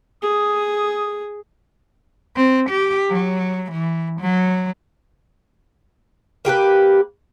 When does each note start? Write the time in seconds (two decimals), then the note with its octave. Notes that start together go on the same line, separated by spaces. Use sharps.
0.23 G#4 D#6
2.37 C4
2.70 G4
3.10 F#3
3.72 E3
4.21 F#3
6.45 A#3 G4 A4 B4